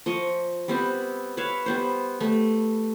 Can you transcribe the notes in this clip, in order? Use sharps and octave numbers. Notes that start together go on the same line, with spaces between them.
F3 D#5 C#6
G3 B3 C4
B4 C#5 E5 F5
G3 B3 C5
G3 A3